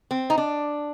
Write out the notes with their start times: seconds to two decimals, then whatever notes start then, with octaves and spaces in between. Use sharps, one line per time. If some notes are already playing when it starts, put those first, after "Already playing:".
0.11 C4
0.30 D#4
0.38 D4